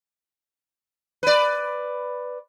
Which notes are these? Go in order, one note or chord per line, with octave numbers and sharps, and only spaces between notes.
B4 D5